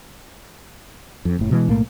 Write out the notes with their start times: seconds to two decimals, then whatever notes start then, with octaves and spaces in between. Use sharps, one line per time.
1.25 F2
1.39 F#1 A2
1.51 B2 E3 G#3
1.68 B1 A2 A3 A#3